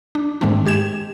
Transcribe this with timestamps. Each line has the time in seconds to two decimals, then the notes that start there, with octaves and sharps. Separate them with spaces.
0.15 D4
0.41 G#2 D#3 G#3 A3 C4 D4
0.66 G#3 G4 G#6 E7